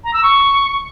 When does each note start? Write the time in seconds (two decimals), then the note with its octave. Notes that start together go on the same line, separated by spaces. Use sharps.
0.04 A#5
0.14 E6
0.23 C#6